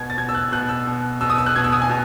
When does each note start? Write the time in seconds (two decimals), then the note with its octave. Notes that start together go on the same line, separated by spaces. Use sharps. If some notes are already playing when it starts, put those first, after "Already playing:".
Already playing: B2 G#6
0.10 A6
0.17 B2 G#6
0.29 E6
0.35 F#6
0.52 B2 F#6
0.69 E6
0.87 B2
1.21 B2 E6
1.30 D#6
1.38 E6
1.46 F#6
1.56 B2 G#6
1.64 E6
1.72 D#6
1.82 G#5
1.90 B2